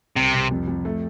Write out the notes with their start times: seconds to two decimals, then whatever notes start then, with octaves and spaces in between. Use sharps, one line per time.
0.16 C2 C3
0.34 C2
0.51 F2
0.68 F2
0.85 A3